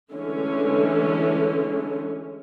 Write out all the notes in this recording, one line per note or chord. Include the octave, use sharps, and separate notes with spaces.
D3 E3 G#3 A3 C#4